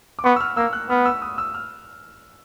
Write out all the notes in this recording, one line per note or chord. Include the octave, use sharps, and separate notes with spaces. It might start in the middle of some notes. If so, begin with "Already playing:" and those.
D6
B3 C#6
E6
F6
A#3 E6
F#6
B3 F6
E6
D#6
E6
F6